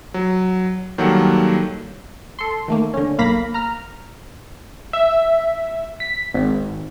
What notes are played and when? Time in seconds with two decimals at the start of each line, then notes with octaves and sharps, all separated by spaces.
0.14 F#3
0.98 D#3 F#3 G3 A#3 A4 F#5
2.39 A4 C6
2.68 D#3 A3 A#3
2.94 D3 C#4
3.18 B1 A#3 F5 B5 A#6 B6
3.54 A#5 F6
4.93 E5
6.00 B6
6.34 G#1